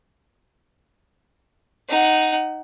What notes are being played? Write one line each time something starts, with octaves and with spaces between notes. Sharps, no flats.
D#4 F#5